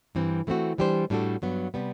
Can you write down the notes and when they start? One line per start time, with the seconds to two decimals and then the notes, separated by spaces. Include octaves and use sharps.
0.15 G2 E3 G3 C4
0.47 E3 A3 C4 F#4
0.78 E3 G3 D4 G4 C5
1.10 A2 G3 D4 F#4 A4
1.42 G2 F#3 B3
1.74 C3 G3 B3